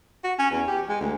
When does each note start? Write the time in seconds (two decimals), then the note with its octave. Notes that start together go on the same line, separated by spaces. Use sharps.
0.24 F#4
0.39 C#4
0.51 E2
0.68 G4
0.89 G#3
1.01 D2